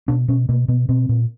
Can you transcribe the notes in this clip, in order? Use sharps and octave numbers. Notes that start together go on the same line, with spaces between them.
B2 D4
B2 C#4
B2 A#3
B2 B3
B2 C4
A#2